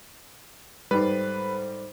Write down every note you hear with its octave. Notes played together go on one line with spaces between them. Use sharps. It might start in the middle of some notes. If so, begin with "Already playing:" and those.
G#2 G3 A4 B4 C5